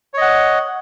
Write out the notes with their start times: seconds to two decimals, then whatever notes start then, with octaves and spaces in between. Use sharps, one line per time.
0.14 C#5
0.18 D#5
0.21 F#5